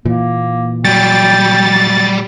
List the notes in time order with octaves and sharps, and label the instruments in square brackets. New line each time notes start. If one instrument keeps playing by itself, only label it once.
[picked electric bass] A#2 E3 [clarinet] A#3
[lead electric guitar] F#3 G3 [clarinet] G5 [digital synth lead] A6